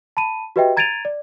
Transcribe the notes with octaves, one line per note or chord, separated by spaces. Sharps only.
A5 B5 D#7
F#4 G4 B4 D#5 E5 G5
A#5 G#6 A6 D7 D#7 F7
D5